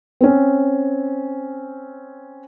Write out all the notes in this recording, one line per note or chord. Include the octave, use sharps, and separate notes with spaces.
C4 C#4